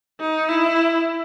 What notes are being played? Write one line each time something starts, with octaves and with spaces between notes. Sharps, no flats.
D#4
E4